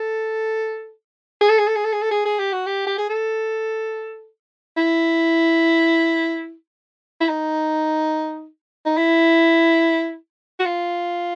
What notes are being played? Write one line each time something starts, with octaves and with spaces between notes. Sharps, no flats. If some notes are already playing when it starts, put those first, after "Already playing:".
Already playing: A4
G#4
A4
G#4
A4
G#4
A4
G#4
A4
G#4
G#4
G4
F#4
G4
G4
G#4
A4
E4
E4
D#4
D#4
E4
F#4
F4